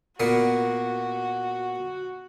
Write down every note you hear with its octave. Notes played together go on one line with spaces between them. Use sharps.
A#2 A#3 B3 F#4